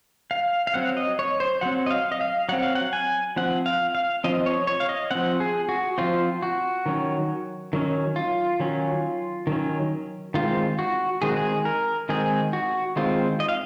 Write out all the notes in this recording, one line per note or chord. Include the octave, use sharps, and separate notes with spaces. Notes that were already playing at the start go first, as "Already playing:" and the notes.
F5
F5
F#3 C4 F#5
D#5
C#5
C5
F#3 C4 F#5
D#5
F5
D#5
F5
F#3 C4 F#5
F5
F#5
G#5
F3 C4 F#5
F5
F5
F3 C4 D#5
C#5
C#5
F5
D#5
F3 C4 F#5
G#4
F#4
F3 C4 F4
F#4
D#3 F#3 C#4
D#3 F#3 C#4
F4
D#3 F#3 C#4
D#3 F#3 C#4
D#3 G#3 C4 F4
F#4
D#3 G#3 C4 G#4
F#4
G#4
A#4
D#3 G#3 C4 G#4
F#4
D#3 G#3 C4 F4
D#5
F5